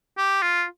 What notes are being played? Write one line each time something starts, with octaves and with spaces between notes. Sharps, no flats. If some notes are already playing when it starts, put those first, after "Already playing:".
G4
F4